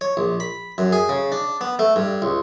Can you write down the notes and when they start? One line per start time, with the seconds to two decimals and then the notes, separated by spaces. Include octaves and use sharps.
0.01 C#5
0.17 A#1
0.40 B5
0.78 F#2
0.92 G#4
1.09 C#3
1.32 D4
1.61 B3
1.79 A3
1.96 G2
2.22 C#2